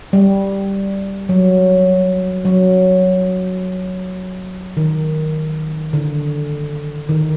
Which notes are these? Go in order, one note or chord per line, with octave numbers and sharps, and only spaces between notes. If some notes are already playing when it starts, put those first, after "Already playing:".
G3
F#3
F#3
D#3
D3
D#3